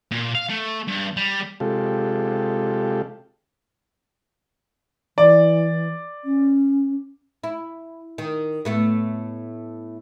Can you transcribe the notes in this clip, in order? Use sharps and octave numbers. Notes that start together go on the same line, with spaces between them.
A#2
F5
A3
G2
G3
C3 G#3 F4 G4 A4
E3 D5
C#4
E4
D#3
A2 A3 B3